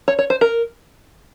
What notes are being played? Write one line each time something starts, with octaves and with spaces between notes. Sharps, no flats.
C#5
C#5
C5
A#4